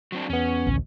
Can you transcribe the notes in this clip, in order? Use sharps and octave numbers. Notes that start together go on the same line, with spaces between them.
F#3 C4 D4
E2 B3 C#4
A1 D2